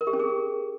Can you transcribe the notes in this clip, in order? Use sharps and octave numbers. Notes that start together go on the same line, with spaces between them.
A#4
G4
C#4
G#4